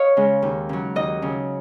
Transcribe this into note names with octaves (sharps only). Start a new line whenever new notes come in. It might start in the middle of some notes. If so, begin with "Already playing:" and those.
Already playing: C#5 D#5 F5
C#3 G#3
D#2
C#3 F#3
D#2 D#5
C#3 F#3